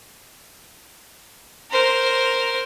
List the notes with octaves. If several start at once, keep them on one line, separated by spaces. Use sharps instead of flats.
A#4 C5